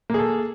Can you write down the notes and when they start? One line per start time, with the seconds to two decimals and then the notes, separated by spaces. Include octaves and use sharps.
0.10 A#3
0.14 G#4
0.19 A4